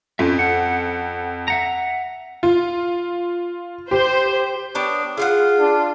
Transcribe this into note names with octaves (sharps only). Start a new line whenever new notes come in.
F2 C#4 F4 E5
F#5
E5 F#5 A#5
F4
G4 C5
B3 D4 G4 C#5
F4 G#4 F5 F#5
D4